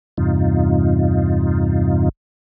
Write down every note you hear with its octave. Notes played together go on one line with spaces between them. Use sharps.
E2 G2 C3 D#4 F4